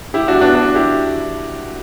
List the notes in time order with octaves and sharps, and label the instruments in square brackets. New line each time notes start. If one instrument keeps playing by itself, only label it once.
[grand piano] E4 G4
D4 F#4
B3 D4
D4 F#4
E4 G4